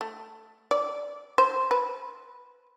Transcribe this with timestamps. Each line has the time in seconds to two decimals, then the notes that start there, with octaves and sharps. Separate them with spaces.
0.01 A3
0.71 D5
1.38 C5
1.71 B4